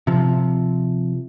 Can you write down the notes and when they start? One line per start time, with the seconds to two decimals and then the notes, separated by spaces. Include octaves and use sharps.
0.07 C3 F3